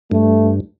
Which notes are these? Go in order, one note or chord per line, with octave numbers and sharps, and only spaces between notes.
G2 A3